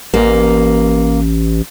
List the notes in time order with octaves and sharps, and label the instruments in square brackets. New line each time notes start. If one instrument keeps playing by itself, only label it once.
[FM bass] A1 [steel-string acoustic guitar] A#3